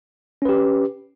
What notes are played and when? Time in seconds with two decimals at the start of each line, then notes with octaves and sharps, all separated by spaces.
0.42 C#4
0.45 B4
0.49 G4